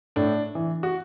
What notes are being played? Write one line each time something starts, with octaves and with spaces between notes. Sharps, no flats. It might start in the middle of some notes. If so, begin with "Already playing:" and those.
A2 D4
E3
F#4